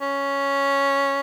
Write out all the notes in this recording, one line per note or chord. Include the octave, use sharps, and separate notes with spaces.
C#4